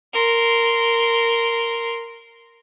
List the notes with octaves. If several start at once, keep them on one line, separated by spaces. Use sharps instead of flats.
A#4 C6